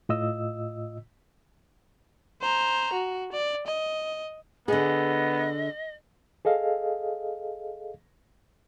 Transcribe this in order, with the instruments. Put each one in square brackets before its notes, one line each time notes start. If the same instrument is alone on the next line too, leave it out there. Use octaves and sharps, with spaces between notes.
[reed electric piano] A2 F4 D#5 E6
[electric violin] C5 A#5
F#4
D5
D#5
[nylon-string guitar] D3 G#4 [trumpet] B3 [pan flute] D#5
[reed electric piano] G#4 A4 D#5 F5